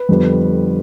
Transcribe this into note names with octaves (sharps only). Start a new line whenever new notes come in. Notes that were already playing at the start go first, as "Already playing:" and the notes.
Already playing: B4
F2 D3 G3 B3